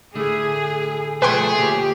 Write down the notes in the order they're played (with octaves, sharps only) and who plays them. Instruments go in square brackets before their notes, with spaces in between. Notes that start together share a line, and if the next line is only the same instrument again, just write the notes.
[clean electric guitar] A2 D3 A3 [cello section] G#4
[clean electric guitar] B2 F3 [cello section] A3 [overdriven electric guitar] G#4 [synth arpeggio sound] B4 G5 C6
[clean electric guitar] D2 A#2 C#5 [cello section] G4